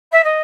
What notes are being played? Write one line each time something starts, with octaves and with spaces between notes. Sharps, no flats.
E5
D#5